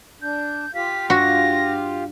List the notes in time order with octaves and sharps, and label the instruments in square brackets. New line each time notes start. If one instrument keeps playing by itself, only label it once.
[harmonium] D4 [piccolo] G6
[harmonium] F4 G4 F5 [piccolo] B6
[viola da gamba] G2 [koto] F#4 [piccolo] A#6